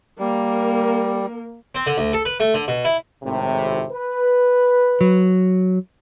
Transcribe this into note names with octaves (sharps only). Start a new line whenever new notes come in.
G3 A#3 A#4
C4
D3
D2
A4
B4
A3
D3
B2
E4
G#1 A2 C3
B4
F#3